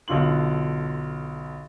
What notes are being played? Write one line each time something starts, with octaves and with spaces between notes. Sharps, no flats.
B1 D3 F4 C6 F#7